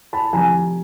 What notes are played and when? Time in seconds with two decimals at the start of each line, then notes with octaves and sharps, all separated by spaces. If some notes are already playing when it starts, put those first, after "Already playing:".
0.13 A5 B5
0.33 F1 F2 C3 F3 G#5 A#5